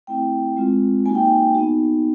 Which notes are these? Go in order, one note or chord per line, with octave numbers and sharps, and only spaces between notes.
A3 C4 E4 G5
G#3 C4 F4
A#3 D#4 F#4 G#5
G5
G#5
B3 D#4 F#4